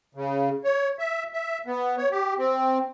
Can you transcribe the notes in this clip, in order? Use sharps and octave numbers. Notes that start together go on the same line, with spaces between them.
C#3
C#5
E5
E5
B3
C#5
G4
C4